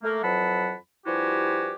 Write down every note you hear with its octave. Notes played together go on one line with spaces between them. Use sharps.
A3 A#3
F2 E3 F#3 F#5 A5 B5
G2 F3 E4 F#4 G4 G#5